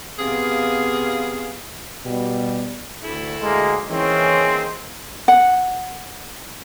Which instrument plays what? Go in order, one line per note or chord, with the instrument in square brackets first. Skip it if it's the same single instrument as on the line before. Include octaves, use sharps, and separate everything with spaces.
[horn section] C3 B3 G#4 F5
[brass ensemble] B2 G3
[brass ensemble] D2 [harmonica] E4 A4
[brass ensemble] D2 [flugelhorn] G#3 [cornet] A#3
[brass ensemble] E3 [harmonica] A#3 D#4 G#4 [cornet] C4 [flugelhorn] C#4
[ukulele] F#5